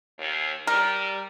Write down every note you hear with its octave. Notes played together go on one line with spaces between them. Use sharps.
D#2
G3 A#4